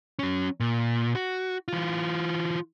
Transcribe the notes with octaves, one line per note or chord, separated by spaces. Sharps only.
F#3 C#4
A#2
F#4
E3 F4